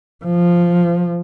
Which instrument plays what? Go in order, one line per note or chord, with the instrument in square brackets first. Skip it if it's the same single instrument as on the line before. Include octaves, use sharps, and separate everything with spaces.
[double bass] F3